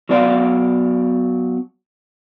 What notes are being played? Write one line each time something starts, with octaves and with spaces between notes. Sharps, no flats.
F#3 B3 D5 E5 F5